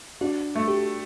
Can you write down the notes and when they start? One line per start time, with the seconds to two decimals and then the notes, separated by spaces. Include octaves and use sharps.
0.21 D4 F#4
0.55 A3
0.68 G4